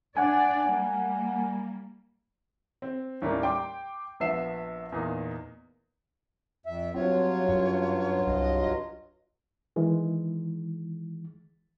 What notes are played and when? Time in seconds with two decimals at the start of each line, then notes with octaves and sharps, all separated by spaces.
0.17 D4 D5 F#5 G#5
0.69 G3 A#3
2.82 C4
3.22 D#2 A2 G3 A#3 C#4
3.43 G5 C6 D6
4.20 A#1 F3 B3 E5 C7 E7
4.92 E2 A#2 D#4
6.66 F2 E5
6.94 G2 F#3 C4 F4 C#5
7.49 F#2
8.27 C2 D#5
9.76 D#3 E3 G#3